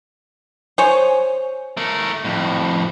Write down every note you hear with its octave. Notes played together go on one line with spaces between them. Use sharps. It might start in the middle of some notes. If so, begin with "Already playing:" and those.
C5 C#5 G#5
A3 A#4
F2 A2